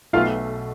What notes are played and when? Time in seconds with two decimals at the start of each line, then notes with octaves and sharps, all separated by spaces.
0.13 B1 B2 A3 F4 F5